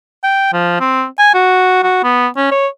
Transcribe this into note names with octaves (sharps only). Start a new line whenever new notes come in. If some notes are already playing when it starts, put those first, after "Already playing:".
G5
F3
C4
G#5
F#4
F#4
B3
C#4
C#5